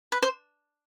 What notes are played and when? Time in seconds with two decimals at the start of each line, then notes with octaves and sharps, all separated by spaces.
0.12 B4
0.22 C5